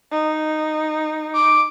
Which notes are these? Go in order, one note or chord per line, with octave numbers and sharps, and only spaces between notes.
D#4
D6